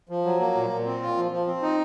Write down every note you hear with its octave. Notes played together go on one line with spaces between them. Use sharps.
F3
F#3
A#3
A#2
A#2
C4
F4
F3
F3
C4
D#4